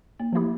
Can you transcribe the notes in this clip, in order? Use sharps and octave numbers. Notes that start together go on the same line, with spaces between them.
A#3
F3 A3 E4 G4